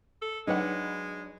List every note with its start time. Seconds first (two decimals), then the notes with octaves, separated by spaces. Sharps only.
0.22 A4
0.47 F#3 G#3 D4 D#4 B4 C#5 F#5